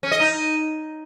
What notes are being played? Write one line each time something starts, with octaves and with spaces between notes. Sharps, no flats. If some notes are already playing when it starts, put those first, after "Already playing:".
C#4
D#5
D#4